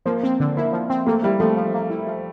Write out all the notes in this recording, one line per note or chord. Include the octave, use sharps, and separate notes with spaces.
F3 A#3
C4
D3
A#3 E4
F3
C4
A3 A#3
G3 E4
F3 A3
F3
A#3
E4
F3